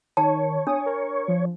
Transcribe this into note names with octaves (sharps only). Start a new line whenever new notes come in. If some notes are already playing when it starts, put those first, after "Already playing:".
D#3 C#5 A5
D4 D#6
A#4
F3